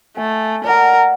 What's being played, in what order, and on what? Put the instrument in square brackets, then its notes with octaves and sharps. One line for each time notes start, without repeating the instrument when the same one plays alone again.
[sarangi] A3 [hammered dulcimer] G#5
[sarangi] A#4 [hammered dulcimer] D5 F#5